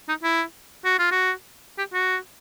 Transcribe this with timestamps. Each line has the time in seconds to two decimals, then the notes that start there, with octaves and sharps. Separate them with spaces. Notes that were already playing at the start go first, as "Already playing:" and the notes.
0.09 D#4
0.23 E4
0.85 F#4
0.99 F4
1.12 F#4
1.78 G4
1.93 F#4